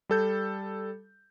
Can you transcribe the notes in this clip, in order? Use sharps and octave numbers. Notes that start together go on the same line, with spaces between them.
G3 A4 G6